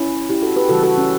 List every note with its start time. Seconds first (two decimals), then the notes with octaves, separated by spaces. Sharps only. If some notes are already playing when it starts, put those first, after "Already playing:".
Already playing: C#4 E4
0.30 E4 G4
0.42 F#4 A4
0.56 G4 B4
0.69 C#3 E3 G3 F#4 A4
0.83 F#4 A4
0.98 C#4